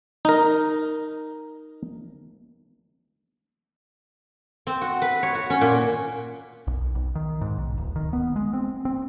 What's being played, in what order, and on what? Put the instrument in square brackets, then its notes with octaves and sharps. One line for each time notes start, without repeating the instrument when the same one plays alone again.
[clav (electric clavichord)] D#4 A#4
[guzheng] C4
F#4
B4
C#5
F#4
C#4
A#2
[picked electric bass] B1
B1
D#3
G#2
B1
D1
D#3
B3
G#3
C4
C4